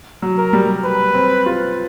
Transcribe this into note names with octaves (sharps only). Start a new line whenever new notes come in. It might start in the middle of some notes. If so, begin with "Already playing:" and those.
F#3
A#4
G3
B4
C4
F4